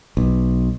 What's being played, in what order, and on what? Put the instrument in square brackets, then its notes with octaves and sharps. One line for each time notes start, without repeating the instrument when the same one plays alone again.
[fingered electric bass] B1